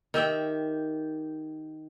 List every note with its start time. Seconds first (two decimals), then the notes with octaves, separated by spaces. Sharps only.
0.14 D#3 G4 E5 G5